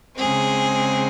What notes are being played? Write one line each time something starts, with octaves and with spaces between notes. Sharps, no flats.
C#3 G#3 C4 G#4